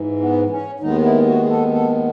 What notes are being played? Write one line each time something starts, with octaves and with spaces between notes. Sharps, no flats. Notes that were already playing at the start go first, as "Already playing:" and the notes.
Already playing: G#2 E3
B3
C#4
D#2 D#3 G#3 B3 D#4
E4
F#4
G#4
A4
A4